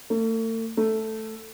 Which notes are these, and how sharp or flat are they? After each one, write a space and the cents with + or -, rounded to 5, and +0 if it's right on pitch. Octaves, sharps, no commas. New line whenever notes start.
A3 +40
A3 +0